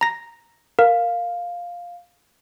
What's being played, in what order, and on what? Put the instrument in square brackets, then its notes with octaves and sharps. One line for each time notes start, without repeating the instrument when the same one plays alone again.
[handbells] A#5 A#6
[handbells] A#4 [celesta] F5